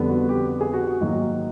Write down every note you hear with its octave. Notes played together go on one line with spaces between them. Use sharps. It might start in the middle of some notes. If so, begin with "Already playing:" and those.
Already playing: F2 D3 G3 B3
F#4
G4
G#4
F#4
F#4
G#2 D#3 F#3 A#3